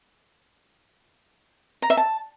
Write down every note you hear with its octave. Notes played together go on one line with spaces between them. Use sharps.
A#5
E5
A5